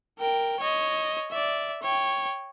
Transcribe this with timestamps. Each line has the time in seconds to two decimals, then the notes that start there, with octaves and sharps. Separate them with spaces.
0.19 A#4 G5
0.60 C#5 D#5
1.31 D5 E5
1.83 C#5 G5